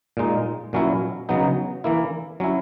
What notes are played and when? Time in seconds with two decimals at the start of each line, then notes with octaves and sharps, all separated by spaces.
0.17 A#2 G#3 D#4
0.73 A#2 F#3 C#4 E4
1.29 C#3 F#3 B3 D#4
1.84 E3 A#3 E4
2.40 F#3 C#4 E4